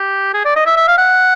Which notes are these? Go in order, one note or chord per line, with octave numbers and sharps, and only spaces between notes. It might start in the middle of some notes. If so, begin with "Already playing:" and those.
Already playing: G4
G#4
D5
D#5
E5
E5
F5
F#5